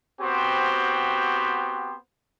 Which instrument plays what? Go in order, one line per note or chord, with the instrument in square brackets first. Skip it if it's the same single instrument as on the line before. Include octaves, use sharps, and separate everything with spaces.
[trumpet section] B3 C4 F#4 G4 C5